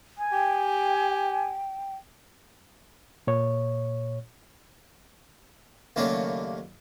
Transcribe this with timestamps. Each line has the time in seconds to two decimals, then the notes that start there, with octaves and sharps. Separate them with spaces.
0.18 G#5
0.32 G4 G5
3.27 A#2 C#5
5.96 D#2 C#3 F#3 A3 A#3 D4